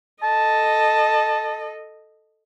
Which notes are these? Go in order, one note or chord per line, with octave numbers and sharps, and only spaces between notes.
A4 D#5 A5